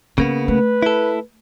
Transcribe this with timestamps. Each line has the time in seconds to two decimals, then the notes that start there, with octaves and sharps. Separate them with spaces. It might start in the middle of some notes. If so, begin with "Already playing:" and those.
0.18 C#3 A#3 B3 C#4
0.48 A3 B4
0.83 E4 A4